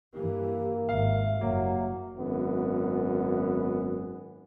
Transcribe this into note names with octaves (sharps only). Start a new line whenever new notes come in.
G2 E3 A#3 G4
G#1 E5 F5
F#1 G2 F#3 A#3
G#1 F#2 B3